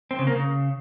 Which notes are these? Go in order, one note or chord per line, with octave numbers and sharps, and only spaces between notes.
C4
C#3
A#3
C#3